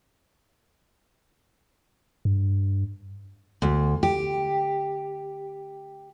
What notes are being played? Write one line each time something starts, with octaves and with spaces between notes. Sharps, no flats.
G2
D2
G4